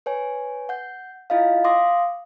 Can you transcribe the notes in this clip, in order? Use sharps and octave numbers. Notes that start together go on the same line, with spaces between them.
B4 C#5 G#5
F#5 G6
E4 F4 D#5 F5
F5 C6 D6 D#6 A#6